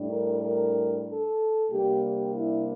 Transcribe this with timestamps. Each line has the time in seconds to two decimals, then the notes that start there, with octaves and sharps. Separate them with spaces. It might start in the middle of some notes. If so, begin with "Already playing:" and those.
Already playing: A2 G3 D4
0.08 A#4
0.40 A#4
1.05 A4
1.70 C3 G3 A#3 D4 G4
2.02 G4
2.34 E4